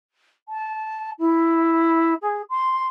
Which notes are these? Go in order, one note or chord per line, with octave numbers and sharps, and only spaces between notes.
A5
E4
G#4
C6